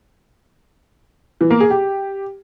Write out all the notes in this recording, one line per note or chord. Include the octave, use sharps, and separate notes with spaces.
E3
A#3
G#4
G4